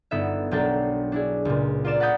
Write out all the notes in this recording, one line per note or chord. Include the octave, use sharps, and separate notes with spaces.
G1 B3 D#4 E5
B1 F#3 D4 A#4 G5 A5
D4 E4 G#4
C#2 A#2
F4 A#4 D5 E7
F#5 A5 B5 D6 D#6 G6